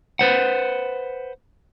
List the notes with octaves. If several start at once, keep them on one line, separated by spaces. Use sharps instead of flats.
B4 C5 F#5